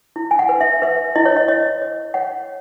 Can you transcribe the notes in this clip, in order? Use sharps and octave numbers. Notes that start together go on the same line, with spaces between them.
E4
G#5
F#5
B4
E5
B4 E5
E4 D#5
C#5
D#5
C#5 D#5
C#5
C#5 F#5